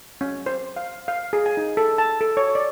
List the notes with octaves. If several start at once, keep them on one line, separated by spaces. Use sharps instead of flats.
C#4
C5
F5
F5
G#4
G#5
D#4
A4
A5
A4
C#5
D5